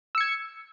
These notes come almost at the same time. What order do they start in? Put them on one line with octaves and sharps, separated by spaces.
E6 C#7 G#6